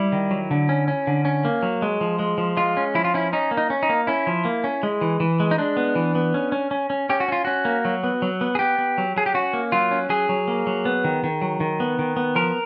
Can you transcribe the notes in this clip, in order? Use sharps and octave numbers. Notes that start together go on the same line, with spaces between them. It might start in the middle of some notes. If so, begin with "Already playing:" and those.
Already playing: G3 E4
D#3
F#3
D3
C#4
C#4
D3
C#4
A#3
F#3
G#3
F3
G#3
F3
G#3 F4
C#4
F3 E4
F4
C#4 E4
C#4 D#4
A#3
D#4
C#4
D#4
A#3
C#4 E4
F3
A#3
C#4
G#3
E3
E3
G#3
D#4
G#3 D4
B3
E3
B3
C#4
C#4
C#4
C#4
C#4 G4
F#4
C#4 F4
C#4 F#4
A#3
F#3
B3
F#3
B3
G#4
B3 G4
B3
F#3
F#3 G#4
G4
C#4 F#4
A#3
F#3 F4
C#4
F#3 G#4
F#3
A#3
F#3
B3
D#3
D#3
F#3
D#3
B3
D#3
B3
F3 A#4